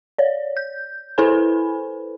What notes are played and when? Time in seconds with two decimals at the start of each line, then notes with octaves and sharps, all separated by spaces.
0.18 C#5 D5
0.57 G6
1.18 E4 A4 B4 C5 G#5 B5